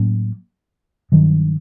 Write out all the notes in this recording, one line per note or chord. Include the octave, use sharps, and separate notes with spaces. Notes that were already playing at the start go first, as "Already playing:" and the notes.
Already playing: A2 F#3 A#3 C#4
G2 D#3 F#3